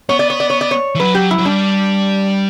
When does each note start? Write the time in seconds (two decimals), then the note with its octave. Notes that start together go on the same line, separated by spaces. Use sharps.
0.09 B3 C#5
0.19 D5
0.30 C#5
0.40 D5
0.50 C#5
0.61 D5
0.71 C#5
0.95 E3
1.00 F#3 B4
1.15 G4
1.31 E4
1.39 F#3
1.45 G3 D4